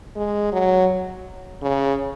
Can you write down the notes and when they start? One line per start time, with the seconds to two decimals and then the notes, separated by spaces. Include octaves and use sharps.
0.16 G#3
0.53 F#3
1.62 C#3